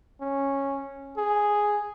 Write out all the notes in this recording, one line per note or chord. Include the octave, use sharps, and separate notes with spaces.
C#4
G#4